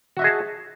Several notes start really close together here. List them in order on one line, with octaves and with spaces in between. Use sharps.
F#4 E5 D#5 G#4 A5